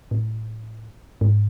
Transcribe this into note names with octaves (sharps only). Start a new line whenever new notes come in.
A2
G#2